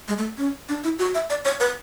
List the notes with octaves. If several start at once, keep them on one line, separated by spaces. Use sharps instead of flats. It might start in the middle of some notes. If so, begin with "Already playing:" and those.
G#3
A3
C#4
D4
E4
F#4
E5
D5
C#5
B4